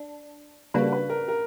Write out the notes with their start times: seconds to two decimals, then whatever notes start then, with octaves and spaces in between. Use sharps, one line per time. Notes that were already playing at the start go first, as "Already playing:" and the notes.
Already playing: D4
0.74 C#3 G3 A#3 D4 F#4 B4
0.92 B4
1.10 A#4
1.28 A#4